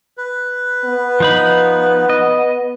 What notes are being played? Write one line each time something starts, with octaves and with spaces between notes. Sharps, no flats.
B4
B3
F3 D#4 B5
D#5